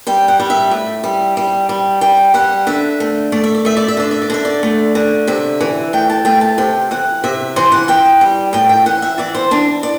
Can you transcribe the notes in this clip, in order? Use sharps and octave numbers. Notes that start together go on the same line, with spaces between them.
G3 G5
F#5
G3
E5
A2
G3
G3
G3
G3 G5
G3 F#5
D3 E5
A3
A3 D5
E5
D5
A3 E5
D5
E5
D3 D5
E5
D5
D3 E5
D5
A3
D3
C3 E5
E3
A3 G5
A5
A3 G5
A5
C3 G5
E3 F#5
C3 E5
E3 C5
F#5
E3 G5
G3
A2 G5
G5
E3 F#5
E5
E3 D5
C5
E3 D4
D5